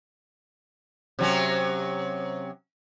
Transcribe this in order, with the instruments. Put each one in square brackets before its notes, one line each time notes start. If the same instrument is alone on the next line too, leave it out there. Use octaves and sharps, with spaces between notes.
[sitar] C3 F#3 C#4